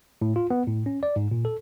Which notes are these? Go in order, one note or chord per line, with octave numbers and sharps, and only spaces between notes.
A2
F4
B3
A2
C#4
D5
G#2
A#2
A4